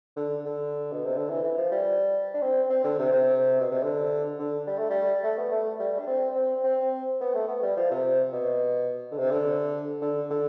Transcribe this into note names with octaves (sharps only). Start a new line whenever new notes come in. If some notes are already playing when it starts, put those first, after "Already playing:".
D3
D3
B2
C3
D3
E3
E3
F3
G3
D4
C4
C4
D3
C3
C3
B2
C3
D3
D3
G3
A3
G3
A3
B3
A3
G3
D4
C4
C4
C4
B3
A3
B3
G3
F3
C3
B2
D3
C3
D3
D3
D3